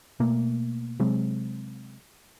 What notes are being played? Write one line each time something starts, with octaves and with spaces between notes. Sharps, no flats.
B2 A3 A#3
C3 F#3 G#3 C4